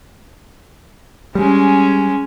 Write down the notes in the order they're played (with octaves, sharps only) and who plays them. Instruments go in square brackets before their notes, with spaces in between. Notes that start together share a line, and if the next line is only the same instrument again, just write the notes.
[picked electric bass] G3 [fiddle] G#3 C#4